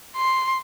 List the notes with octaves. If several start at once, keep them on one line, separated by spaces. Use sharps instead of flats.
C6